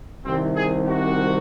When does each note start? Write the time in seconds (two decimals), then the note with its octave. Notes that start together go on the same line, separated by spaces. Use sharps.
0.25 C2 C3 D#3 C4
0.55 G#4
0.85 F#4